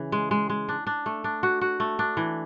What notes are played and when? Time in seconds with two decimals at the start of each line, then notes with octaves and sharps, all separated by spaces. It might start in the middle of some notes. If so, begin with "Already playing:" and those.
Already playing: C#3 E3
0.12 G#3
0.31 G#3
0.50 G#3
0.69 D4
0.87 D4
1.06 A3
1.24 D4
1.43 F#4
1.61 F#4
1.80 A3
1.99 D4
2.17 E3